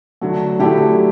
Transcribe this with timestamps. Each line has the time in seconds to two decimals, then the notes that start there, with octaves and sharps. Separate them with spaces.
0.21 D3 F#3 A3
0.59 D3 F#3 A3 E4 G4